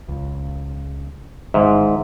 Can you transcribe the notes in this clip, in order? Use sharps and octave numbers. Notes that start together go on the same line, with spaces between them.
C#2
A1 G#2 D#3 E5